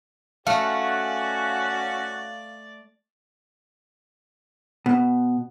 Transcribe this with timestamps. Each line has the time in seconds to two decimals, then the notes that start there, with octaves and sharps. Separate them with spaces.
0.47 A3 C#4 F#4 D5 F5
4.86 B2